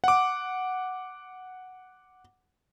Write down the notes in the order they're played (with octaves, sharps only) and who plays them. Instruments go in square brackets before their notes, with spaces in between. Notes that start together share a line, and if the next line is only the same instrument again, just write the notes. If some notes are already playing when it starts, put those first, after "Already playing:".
[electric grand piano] F#5 D6